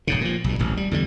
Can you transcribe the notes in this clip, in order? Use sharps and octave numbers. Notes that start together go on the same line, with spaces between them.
D#1 G#2 C#3
A#2 F3
B1 G2
D1 A1
G3
E2 D3 G3